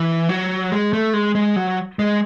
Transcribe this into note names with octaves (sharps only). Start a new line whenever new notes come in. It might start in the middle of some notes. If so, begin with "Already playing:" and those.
Already playing: E3
F#3
G#3
A3
G#3
G#3
F#3
G#3